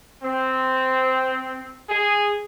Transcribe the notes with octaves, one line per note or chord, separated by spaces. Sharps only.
C4
G#4